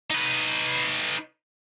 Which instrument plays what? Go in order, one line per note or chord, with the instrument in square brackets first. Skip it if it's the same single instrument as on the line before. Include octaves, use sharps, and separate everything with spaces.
[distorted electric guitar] D#4 B4